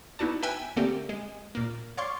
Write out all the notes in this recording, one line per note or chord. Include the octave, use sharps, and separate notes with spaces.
B3 D#4 E4 F#4 D5 A5
B4 E5 G5 G#5 E6
D3 A3 A#3 C4 G4
G#3
A#2 A#3
C#5 D5 F5 C6 C#6